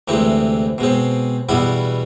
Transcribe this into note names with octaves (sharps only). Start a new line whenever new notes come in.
D2 C3 E3 G#3 C4
B2 G#3 C4
E2 B2 G3 B3 E4